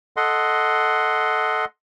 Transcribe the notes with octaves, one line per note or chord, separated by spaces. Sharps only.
A4 D#5 F#5 C6